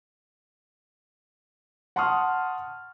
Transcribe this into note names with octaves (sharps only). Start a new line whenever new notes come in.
F#5 A5 C6 C#6 D#6 F6